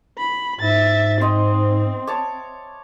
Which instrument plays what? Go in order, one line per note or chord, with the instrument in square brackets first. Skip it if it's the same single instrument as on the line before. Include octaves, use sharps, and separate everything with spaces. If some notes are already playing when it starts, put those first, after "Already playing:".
[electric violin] B5
[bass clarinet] G#2 [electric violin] E5 A6
[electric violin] C4 [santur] C5 D#5 E5
[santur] C#5 A5 D6